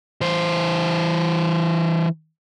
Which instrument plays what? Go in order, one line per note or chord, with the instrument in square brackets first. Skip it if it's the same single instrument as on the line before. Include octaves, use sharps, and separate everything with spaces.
[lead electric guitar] E3 C5